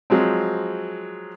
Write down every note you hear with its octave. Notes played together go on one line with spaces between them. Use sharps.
F3 F#3 G#3 C4